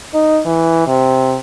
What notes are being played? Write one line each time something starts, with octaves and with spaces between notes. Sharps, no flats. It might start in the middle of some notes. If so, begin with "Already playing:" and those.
D#4
E3
C3